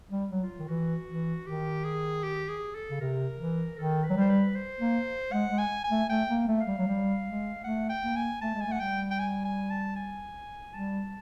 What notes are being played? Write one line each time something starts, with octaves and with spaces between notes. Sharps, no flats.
G3
F#3
F4
D#3
E3 F#4
E3
D#3 G4
G#4
G4
G#4
A4
C#3
C3 A#4
E3
D#3 A4
B4
F#3
G3 C5
B4
C5
A#3
G#3 F#5
G#3
G#5
G#5
A3
A3 G5
A#3
A3
F5
G3
F#3
G3
G#3
A3 F#5
G5
A#3
G#5
A3 A5
G#3
G#5
A3
F#5
G3 G5
G5
G#5
G#5
A5
G#5
G3 A5